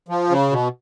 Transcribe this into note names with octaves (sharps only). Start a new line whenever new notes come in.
F3
C#3
B2